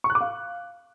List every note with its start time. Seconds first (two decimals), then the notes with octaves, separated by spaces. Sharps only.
0.04 C#6
0.10 F#6
0.15 D6
0.21 F5